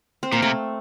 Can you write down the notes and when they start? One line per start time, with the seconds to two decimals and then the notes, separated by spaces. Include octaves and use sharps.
0.23 C4
0.32 A#2 A#3
0.42 C3 A3